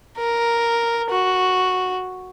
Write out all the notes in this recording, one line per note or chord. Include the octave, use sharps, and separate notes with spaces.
A#4
F#4